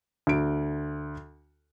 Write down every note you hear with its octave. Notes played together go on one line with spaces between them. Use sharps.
D2 D7